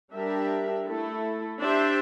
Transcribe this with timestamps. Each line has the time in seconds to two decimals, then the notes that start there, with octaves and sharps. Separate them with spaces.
0.13 G3 D4 G4 A#4 E5
0.87 A3 E4 A4
1.60 D4 G4 C5 E5